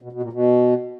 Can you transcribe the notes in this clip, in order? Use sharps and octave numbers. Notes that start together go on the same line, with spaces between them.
B2
B2
A#2
B2